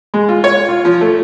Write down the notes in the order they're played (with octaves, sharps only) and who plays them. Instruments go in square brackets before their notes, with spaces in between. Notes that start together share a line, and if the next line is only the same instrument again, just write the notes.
[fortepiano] G#3
F4
C#5
F4
F3
A3